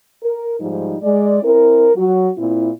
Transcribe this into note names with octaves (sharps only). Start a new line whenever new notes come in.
A#4
G#2 F3 G3 D#4
G#3 D5
C4 E4 A#4
F#3 F#4
A#2 C4 E4